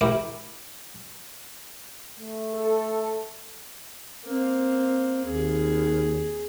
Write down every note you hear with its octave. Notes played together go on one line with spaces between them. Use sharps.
E4 G4 A#4
A3
A4
A#3 C4
D#2 G#4